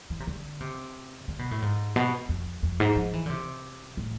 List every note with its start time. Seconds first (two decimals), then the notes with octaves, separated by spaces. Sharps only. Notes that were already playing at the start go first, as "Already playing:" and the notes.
0.10 E3
0.20 C3
0.27 D3
0.61 C3
1.28 D3
1.39 B2
1.51 A2
1.62 G#2
1.96 B2
2.29 F2
2.63 F2
2.80 G#2
2.96 F3
3.13 E3
3.26 D3
3.30 C3
3.97 A2